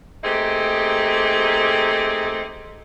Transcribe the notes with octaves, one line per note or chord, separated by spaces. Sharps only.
A3 A#3 C4 D#4 G4 G#4